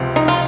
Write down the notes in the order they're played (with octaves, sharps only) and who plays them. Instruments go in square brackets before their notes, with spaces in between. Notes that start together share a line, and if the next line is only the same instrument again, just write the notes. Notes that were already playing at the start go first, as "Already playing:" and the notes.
Already playing: [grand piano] C#2 C3 F3
[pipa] D#4
F4